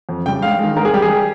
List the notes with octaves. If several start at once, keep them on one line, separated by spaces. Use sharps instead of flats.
F2
C#3 G3 G5
G#2 F5
D#3 G#3
G#2 A#4
G#4
G3 G4
G#4